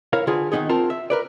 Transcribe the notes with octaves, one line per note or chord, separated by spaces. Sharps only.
E4 A#4 C#5 F5
D3 F4 G#4 B4
D#3 E3 B3 D#4 G#4
C4 F4 A#4 A5
E5
A#4 B4 D5